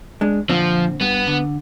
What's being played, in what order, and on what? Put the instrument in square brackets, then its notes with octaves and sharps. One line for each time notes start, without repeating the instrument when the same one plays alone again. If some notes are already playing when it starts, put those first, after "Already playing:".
[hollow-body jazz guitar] G#3 D4
[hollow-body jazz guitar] A#2 D3 C4 [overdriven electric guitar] F3
[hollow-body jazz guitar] G2 [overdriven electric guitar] B3
[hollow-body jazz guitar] D3